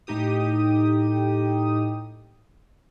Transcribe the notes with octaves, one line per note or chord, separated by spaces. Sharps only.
A2 D#4 G4 D#6